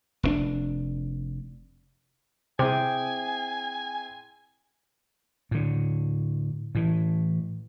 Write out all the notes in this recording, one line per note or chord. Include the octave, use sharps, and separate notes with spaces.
F1 G#2 D4
C3 C4 E4 G#4 G5 G#5 D6 D#6
A2 D3
A2 E3